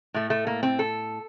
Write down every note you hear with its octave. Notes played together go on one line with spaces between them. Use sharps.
A2 A3
A3
A#3
C4
A4